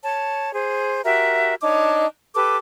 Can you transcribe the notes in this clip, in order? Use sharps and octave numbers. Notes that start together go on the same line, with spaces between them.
C#5 A5
G#4 C5
F#4 G4 A#4 E5
D4 D#4 C#5 D6
G4 A4 B4 D6